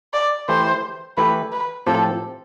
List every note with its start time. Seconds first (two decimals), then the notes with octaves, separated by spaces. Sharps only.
0.13 D5
0.49 E3 A3 E4 G4 C5
1.17 E3 A3 E4 G4 B4
1.52 B4
1.87 A2 F3 C4 G4 A4